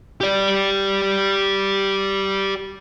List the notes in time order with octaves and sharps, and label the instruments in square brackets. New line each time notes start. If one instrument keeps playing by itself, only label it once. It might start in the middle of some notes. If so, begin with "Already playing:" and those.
[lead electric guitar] G4 D5